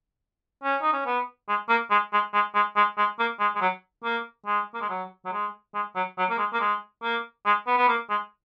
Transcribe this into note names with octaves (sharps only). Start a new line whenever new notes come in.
C#4
D#4
C#4
B3
G#3
A#3
G#3
G#3
G#3
G#3
G#3
G#3
A#3
G#3
G#3
F#3
A#3
G#3
A#3
G#3
F#3
F#3
G#3
G#3
F#3
F#3
A#3
G#3
A#3
G#3
A#3
G#3
B3
B3
A#3
G#3